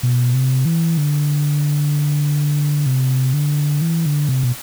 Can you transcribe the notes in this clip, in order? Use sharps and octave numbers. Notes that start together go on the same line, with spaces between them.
B2
C3
E3
D3
C3
D3
E3
D3
C3
B2